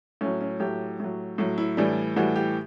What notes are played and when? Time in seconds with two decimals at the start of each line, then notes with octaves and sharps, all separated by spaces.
0.21 A2 F#3 C#4
0.41 C#4
0.60 A2 F#3 G4
1.00 A2 F#3
1.38 A2 F#3
1.58 E4
1.77 A2 E3 G3 D4
2.16 A2 E3 G3 F#4
2.36 G4